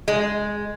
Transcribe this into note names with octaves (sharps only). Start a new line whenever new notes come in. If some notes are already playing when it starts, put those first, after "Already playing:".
G#3